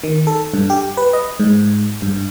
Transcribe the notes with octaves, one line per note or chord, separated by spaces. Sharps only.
D#3
A4
G2
G4
B4
D#5
G#2
G2